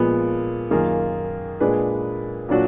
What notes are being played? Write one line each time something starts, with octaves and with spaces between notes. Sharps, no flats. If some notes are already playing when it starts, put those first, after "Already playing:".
Already playing: A#2 F3 G#3 B3
F#2 D#3 A#3 F4 G#4
A#2 G#3 D4 G#4 B4
A#2 F#3 D4 F#4